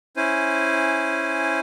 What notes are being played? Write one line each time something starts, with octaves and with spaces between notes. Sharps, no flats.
C#4 E4 C5 G#5